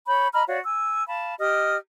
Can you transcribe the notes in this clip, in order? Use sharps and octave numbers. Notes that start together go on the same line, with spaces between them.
C#5 B5 G6
D#5 A#5 B5 F6
F#4 C#5 D5 F5
G#5 E6
F5 A5 B5
G4 D#5 D#6 F6